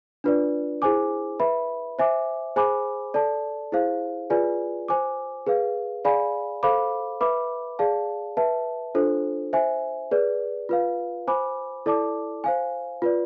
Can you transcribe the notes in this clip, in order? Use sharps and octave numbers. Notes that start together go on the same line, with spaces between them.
D4 F4 B4 D5
E4 G#4 C5 G#5 D6
B4 E5 B5
C5 E5 G#5 D6
G#4 C5 G#5 B5 D6
A4 D5 A5
E4 G#4 C5 F5
F4 G#4 B4 D5 G#5
C5 G#5 D6
G#4 B4 F5
G#4 D5 F5 G#5 B5
A4 C5 F5 B5 D6
B4 E5 B5 D6
G#4 D5 F5 A5
B4 E5 A5
D4 F4 A4 C5
C5 E5 G#5
G#4 B4 D5
F4 B4 F5
C5 G#5 B5 D6
E4 A4 D5 A5 D6
C5 F5 G#5
F4 B4 D5